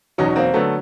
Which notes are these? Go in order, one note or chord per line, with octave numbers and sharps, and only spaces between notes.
E2 B2 F#3 C#4 D#4
A#3 C4
D3 F#3 A3 B3